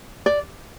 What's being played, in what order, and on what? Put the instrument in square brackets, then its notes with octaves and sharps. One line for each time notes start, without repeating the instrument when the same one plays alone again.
[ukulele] D5